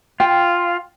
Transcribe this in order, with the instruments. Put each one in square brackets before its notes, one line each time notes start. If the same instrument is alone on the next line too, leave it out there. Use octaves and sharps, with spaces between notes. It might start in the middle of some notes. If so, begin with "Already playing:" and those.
[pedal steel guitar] F4 [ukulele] G5